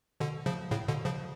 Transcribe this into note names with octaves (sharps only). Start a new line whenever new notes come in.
B2 D3
C#3 F3
A2 C#3
B2 D3
C#3 F3